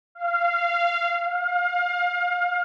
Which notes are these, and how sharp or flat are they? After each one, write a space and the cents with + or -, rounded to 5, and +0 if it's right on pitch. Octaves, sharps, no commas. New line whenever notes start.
F5 -15
F5 +25